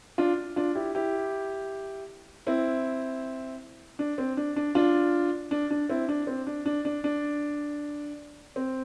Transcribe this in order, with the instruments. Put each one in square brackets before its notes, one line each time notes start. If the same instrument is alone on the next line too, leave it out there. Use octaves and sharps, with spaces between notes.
[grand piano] D4 F4
D4 F4
E4 G4
E4 G4
C4 E4
D4
C4
D4
D4
D4 F4
D4
D4
C4 E4
D4
C4
D4
D4
D4
D4
C4